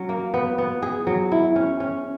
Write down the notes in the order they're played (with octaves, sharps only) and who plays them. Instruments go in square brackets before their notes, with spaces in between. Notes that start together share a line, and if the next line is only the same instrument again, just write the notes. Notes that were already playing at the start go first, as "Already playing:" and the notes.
Already playing: [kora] F#3 C#4
A#3
B3
B3
G#4
F#3
E4
C#4
C#4